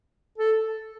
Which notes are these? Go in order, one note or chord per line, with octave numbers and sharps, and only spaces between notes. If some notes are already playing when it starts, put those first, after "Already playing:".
A4